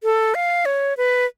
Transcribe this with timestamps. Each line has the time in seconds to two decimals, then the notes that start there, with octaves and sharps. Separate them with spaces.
0.04 A4
0.35 F5
0.65 C#5
0.97 B4